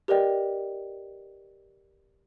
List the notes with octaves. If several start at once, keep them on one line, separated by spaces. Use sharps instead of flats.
G4 A#4 B4 D5 D#5 G5